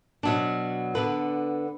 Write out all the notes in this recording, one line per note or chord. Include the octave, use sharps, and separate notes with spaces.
B2 F#3 D4
D3 B3 D4 B4